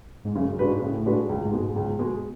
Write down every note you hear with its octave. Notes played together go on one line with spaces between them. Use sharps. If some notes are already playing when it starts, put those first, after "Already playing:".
G#2
F#2 C#3
F#2
G#2 G#3 D4 F#4 B4
G#2
A2 C#3
G#3 D4 F#4 B4
C#2
G#2
B2 G#3
G#2
C#2
B2 G#3